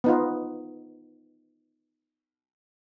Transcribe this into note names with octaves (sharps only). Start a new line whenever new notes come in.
B3 D#4 F4